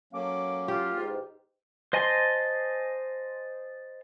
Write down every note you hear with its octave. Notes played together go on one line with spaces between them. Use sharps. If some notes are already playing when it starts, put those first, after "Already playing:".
F#3 A#3 C#4 A4 F5 D6
F4 G4
E2 G#2
C5 D#5 G#5 A5 C6